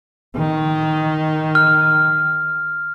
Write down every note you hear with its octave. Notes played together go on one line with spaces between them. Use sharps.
D#3
F6